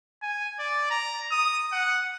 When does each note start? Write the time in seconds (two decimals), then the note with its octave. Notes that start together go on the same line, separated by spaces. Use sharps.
0.23 G#5
0.59 D5
0.91 A#5
1.31 D#6
1.73 F#5